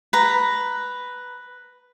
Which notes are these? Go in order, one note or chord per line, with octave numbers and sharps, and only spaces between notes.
B4 A#5